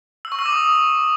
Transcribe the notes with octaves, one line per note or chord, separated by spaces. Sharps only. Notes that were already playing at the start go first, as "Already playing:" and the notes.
E6
C#6
E6
D6
D#6